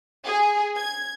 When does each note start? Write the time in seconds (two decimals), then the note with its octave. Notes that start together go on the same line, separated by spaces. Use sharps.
0.25 G#4
0.76 G#6